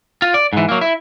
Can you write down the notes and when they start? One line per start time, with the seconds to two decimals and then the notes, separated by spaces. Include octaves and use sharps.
0.22 F4
0.34 D5
0.53 G#2 E3
0.69 F#3 A#3
0.81 E4